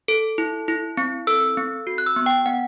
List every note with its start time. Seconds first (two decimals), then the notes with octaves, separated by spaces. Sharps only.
0.08 A4
0.38 E4
0.68 E4
0.97 C4
1.27 A4 E6
1.57 C4
1.87 F#4
1.98 F#6
2.06 E6
2.16 B3
2.26 G5
2.46 B3 F#5